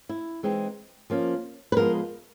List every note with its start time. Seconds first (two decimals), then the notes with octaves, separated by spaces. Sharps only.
0.09 E4
0.43 E3 G#3 C4 D#4
1.10 F3 A#3 C#4
1.72 B4
1.76 F3 G#3 B3 A#4